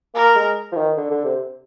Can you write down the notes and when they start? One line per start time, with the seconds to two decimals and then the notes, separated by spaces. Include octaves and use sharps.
0.15 A#3 A#4
0.35 G#3
0.72 F3
0.76 D#3
0.97 D3
1.11 D3
1.25 C3